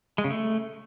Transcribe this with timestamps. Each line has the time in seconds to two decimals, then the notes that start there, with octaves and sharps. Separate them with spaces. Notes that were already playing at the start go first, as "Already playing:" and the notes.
0.18 G#3
0.24 C#3
0.30 A3